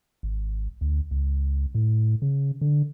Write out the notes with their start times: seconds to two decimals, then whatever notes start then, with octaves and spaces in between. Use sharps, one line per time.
0.23 G#1
0.81 D2
1.11 C#2
1.75 A2
2.22 C#3
2.61 D3